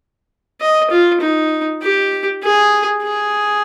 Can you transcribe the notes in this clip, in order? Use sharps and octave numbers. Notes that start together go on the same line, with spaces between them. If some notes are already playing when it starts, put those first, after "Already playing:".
D#5
F4
D#4
G4
G#4
G#4